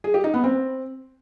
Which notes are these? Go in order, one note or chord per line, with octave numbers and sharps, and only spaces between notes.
G#4
G4
D#4
B3
C4